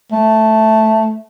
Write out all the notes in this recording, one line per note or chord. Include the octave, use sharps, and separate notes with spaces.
A3